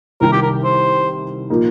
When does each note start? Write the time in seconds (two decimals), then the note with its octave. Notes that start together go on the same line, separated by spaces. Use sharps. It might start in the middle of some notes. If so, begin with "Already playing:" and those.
0.21 C2 C3 D#3 G3 A#4
0.32 G4
0.43 A#4
0.64 C5
1.50 A#2 F3 A#3 D#4